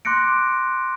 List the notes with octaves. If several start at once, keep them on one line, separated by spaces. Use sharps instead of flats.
C6 D6 F#6 A#6 C#7 D7